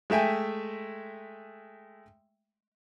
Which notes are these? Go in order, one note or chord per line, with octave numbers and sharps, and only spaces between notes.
G#3 A3 E5 G5 G#5